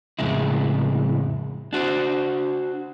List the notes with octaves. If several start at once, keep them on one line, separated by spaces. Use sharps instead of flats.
F2 A2 C#3 G#3 E4
D4 F#4 C5